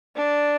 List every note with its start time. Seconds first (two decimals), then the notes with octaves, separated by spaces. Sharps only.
0.16 D4